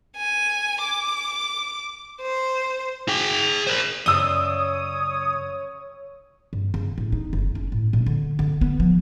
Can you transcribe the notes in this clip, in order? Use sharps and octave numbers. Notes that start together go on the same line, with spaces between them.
G#5
D6
C5
G#4 G5
A#4 C5
F#2 C#3 C#5 D5 D#6 E6 G7
G2
C#3
A2
D#4
F#1
C#4
A2
A#2
D3
D3
B3
F3